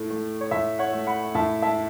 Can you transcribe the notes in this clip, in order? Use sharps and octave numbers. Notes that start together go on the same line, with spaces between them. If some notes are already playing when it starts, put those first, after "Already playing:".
Already playing: A2 A3
A3
C#5
A2 E5
C#5 F#5
A3
F#5 B5
A2 E5 A5
E5 A5